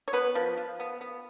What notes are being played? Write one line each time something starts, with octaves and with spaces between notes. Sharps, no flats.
C#5
B3 B4
F3
F3
B3
B3